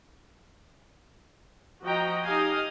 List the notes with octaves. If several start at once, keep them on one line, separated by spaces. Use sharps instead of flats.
F3 F#4 D#5 G5 A#5
D#4 G4 D#5 F5 G#5